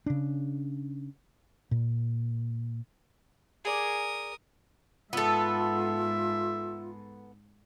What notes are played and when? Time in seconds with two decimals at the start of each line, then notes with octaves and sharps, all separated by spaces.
0.06 C#3 D4
1.71 A#2
3.65 G#4 A#4 D5 D#6
5.13 G#2 B3 F4 A4 E5